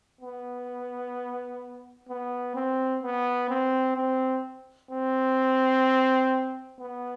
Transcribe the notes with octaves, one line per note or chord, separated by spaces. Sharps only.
B3
B3
C4
B3
C4
C4
C4
B3